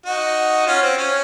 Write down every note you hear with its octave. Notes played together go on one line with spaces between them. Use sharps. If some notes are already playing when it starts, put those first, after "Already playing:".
D#4 F#4
C#4 F4
C4
C#4